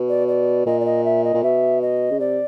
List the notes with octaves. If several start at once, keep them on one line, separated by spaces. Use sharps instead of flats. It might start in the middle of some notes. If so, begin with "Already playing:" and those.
Already playing: B2
D5
D5
A#2 D#5
D5
D#5
E5
D#5
A#2
B2 E5
D#5
C#3
C3 D5